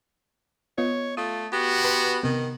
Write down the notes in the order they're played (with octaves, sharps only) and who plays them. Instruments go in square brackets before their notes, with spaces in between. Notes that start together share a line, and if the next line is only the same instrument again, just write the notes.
[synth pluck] B3 F4 D#5 [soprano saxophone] C#5
[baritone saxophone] A3 [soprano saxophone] F4 [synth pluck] D#6
[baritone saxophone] B3 [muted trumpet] F#4 [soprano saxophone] G4
[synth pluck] B4 A5 C6
[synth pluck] C3 B3 [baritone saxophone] D#3